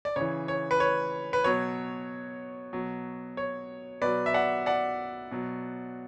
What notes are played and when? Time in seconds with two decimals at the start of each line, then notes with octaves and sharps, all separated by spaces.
0.05 D5
0.16 C#3 E3 C#5
0.48 C#5
0.71 B4
0.80 C#5
1.33 B4
1.44 B2 F#3 C#5
2.73 B2 F#3
3.37 C#5
4.01 B2 F#3 B4 D5
4.26 E5
4.34 D5 F#5
4.66 D5 F#5
5.31 B2 F#3